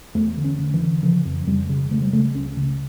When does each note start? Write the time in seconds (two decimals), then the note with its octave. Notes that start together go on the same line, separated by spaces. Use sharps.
0.15 E2 A3
0.37 D3
0.44 C#4
0.59 D3
0.74 E3
0.80 D3
1.03 C#3 F3
1.25 F2
1.47 F2 G3
1.69 C#3
1.91 C#3 A3
2.02 G3
2.13 C#3 A3
2.35 C#2 C#4
2.57 C#3